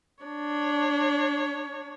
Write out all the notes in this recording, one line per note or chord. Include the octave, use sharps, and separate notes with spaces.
D4 C#5